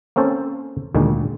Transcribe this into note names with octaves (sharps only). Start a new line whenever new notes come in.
A#3 C4 C#4 A4 C5
D2 A#2 D#3 G#3